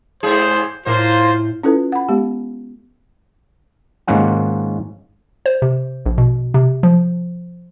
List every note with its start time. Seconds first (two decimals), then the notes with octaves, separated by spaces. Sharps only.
0.23 G#2 G#4 C5
0.86 A2 A#3 F4 A#4 C5
1.63 C#4 E4 F4 A4 B4
1.92 F#5 B5
2.09 G#3 B3 G4
4.07 G#2 D#3 A#3 C#4 F4 F#5
5.46 C5
5.62 C3
6.06 A#1
6.18 B2
6.54 C3
6.83 F3